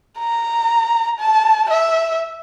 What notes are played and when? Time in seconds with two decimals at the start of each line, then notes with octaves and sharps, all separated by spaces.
0.19 A#5
1.19 A5
1.70 E5